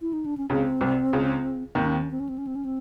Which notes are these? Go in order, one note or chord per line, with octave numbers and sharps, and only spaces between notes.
E4
D#4
D4
C#4
C#2 C#3 C4
C2 C3
C#2 C#3
D#2 D#3 C4
C#4
C4
C#4
C4
C#4
C4
C#4
C4
C#4
C4